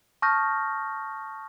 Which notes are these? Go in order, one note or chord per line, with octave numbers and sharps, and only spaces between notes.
A5 C#6 D#6 F6 G6 A#6